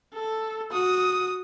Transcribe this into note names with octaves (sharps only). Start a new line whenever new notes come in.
A4
F#4 D#6